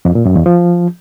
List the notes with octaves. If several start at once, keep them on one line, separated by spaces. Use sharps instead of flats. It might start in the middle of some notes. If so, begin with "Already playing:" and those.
F2
A#2
F#2
E2
F3